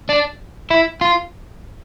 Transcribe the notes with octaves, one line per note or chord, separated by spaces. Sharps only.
D4
E4
F4